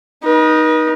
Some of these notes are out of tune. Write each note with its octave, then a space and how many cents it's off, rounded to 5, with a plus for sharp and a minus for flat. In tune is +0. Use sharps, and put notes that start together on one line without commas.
D#4 +0 B4 -45